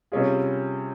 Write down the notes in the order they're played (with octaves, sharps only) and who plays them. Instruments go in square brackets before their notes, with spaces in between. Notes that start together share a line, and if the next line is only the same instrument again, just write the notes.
[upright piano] C3 G3 C#4 F4 G#4